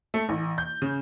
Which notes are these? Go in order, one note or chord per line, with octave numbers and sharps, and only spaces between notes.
A3
A1
G6
C#3